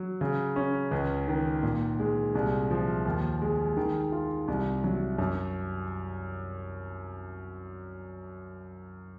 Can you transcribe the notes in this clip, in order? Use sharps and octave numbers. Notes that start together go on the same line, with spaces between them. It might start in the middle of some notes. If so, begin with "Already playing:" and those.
Already playing: F#3
C#3
C#4
C#2
D#3
A#2
G#3
C2
F3
D#2
G#3
D#3
F4
C2
F#3
F#2